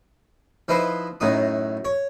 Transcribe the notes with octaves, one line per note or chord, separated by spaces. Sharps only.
F3 D#4 E4 B4 C5
F#2 A2 D#4 D#6
C#5